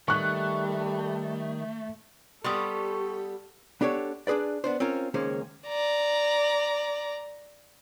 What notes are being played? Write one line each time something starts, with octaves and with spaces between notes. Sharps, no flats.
D#3 G3 A3 C#6 F#6
G3 B3 G4 A4 C6 C#6 D#6 F6
B3 D4 G4 A4 C#5
D4 F#4 G#4 B4 D5
B3 D4 C5
C4 C#4 F4 A#4
C#2 D#3 A#3 C#4 G#4 C5
D5 A#5